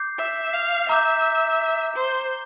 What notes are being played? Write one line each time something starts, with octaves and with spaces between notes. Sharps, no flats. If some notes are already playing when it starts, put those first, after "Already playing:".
Already playing: D6 G6 C7
E5
F5
E5 A#5 D6 G6
C5